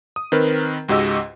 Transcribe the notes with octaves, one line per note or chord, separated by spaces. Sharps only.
D#6
D#3 C4 A#4 B4
C#2 G#2 F#4 G4 D#5 E6